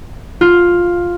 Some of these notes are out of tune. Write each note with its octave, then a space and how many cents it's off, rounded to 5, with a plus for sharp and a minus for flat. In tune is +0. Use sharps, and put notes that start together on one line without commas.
F4 +5